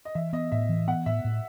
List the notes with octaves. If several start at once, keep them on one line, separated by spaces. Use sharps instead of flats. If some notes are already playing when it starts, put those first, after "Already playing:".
D#5
E3 E5
B3 D#5
A2 E5
E3
B3 F#5
A2 E5
A2